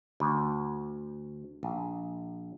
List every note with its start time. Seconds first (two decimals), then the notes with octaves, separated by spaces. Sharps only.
0.20 D2
1.63 A#1